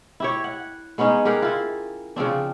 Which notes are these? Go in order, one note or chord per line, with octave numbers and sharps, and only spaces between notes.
E4 G4 C#5
F#5
G#3 B3 C#4 D#4
G4 G#4 A#4 F#5
E4 F4
C#3 F3 C4 D4